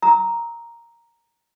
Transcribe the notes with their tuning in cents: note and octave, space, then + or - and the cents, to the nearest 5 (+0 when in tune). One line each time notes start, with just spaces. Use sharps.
A#5 +0 E6 -45